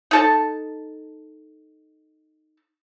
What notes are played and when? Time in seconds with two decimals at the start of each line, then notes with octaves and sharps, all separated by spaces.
0.11 D#4 A4 A5